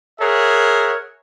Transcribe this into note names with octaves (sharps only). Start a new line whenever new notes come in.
G#4 A#4 C#5 E5 F#5